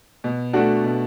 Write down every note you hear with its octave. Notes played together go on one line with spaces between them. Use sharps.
B2
A3 D4 F#4
B2